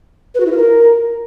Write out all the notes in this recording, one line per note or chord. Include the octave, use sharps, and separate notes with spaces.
B4
F#4
E4
F4
A#4